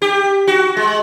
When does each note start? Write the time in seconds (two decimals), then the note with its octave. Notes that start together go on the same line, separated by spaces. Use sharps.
0.02 G4
0.48 F#4
0.77 G#3